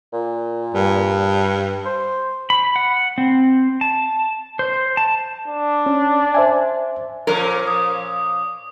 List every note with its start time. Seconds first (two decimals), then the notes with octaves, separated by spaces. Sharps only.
0.13 A#2
0.74 G2
1.85 C5
2.50 B5
2.76 F#5
3.18 C4
3.81 A5
4.59 C5
4.97 A5
5.48 D4
5.86 C#4
6.34 C5 E5 G#5
7.27 A#2 F3 C#4 A#4
7.67 D#6